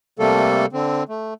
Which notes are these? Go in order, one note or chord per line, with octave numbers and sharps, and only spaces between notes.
C3 G3 A3 A#3 A4
D3 C4
A3